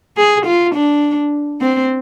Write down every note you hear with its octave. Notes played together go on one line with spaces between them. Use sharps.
G#4
F4
D4
C4